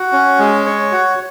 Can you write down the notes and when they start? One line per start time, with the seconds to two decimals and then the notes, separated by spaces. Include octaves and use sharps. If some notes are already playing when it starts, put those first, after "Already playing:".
Already playing: F#4
0.12 C#4
0.39 G#3
0.65 C#5
0.92 F#4